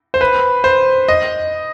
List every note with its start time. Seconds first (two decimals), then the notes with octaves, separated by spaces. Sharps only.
0.14 C5
0.21 B4
0.64 C5
1.08 D#5